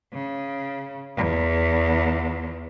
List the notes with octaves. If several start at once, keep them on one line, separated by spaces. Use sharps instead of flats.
C#3
E2